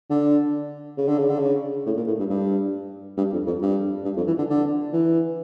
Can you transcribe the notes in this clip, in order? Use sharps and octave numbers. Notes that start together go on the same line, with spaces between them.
D3
C#3
D3
C#3
D3
C#3
A2
A#2
A2
G2
G2
G2
F2
F2
G2
G2
F2
E3
D3
D3
E3